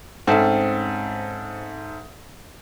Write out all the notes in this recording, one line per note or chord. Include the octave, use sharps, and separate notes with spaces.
G#2 C4 C#4 A4 E5